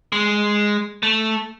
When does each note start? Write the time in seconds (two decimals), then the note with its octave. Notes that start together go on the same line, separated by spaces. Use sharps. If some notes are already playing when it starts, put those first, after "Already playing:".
0.12 G#3
1.03 A3